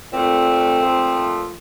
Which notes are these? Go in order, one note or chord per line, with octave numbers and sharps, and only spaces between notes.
A#2 A3 C4
A#2 F3 A3